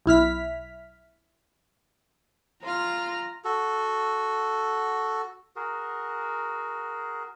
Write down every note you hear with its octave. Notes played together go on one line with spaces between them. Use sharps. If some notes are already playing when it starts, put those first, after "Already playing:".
B1 E4 F6 B6
F4 A#5 F6
F#4 A4
F#4 G#4 A#4